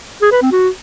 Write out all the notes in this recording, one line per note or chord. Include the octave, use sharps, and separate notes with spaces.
G#4
B4
C4
F#4